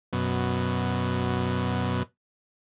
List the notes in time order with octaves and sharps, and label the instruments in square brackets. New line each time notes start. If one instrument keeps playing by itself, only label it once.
[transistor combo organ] F#2 B2